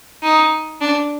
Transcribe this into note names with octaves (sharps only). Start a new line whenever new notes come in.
D#4
D4